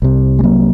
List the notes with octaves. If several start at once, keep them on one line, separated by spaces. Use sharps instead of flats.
C2 C3
G#3
F#3 A#3